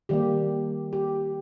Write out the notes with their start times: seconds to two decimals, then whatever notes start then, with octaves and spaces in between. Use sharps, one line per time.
0.09 D#3 G3 A#3 G4
0.93 G4